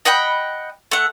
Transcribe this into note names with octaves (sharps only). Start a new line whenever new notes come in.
D#5 F#5 G5 B5
A3 F#5